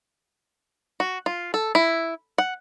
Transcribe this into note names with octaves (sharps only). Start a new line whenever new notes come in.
F#4
F4
A4
E4
F#5